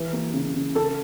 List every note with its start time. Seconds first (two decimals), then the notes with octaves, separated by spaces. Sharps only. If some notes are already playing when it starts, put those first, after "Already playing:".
Already playing: E3
0.13 A#3
0.34 C#3
0.54 C#3
0.75 C#3 A4